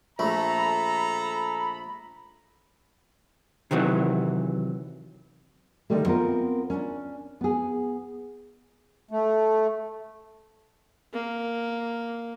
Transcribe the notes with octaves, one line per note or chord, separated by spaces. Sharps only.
A#1 A3 A4 A#5 B5
C3 D#3 E3 F#3
D3 D#3 G3 A3
B3 C4 F4 A#4
C#4 D4
B3 G#4
A3
A#3